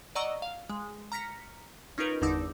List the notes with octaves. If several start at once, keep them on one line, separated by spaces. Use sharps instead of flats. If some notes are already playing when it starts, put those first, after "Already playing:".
D5 D#5 F#5 A#5 C#6 E6
F5
G#3
A#5 F6 A#6 B6 C#7
C#4 D#4 F4 A#4 B4
G1 E2 D3 D#4 D6 E6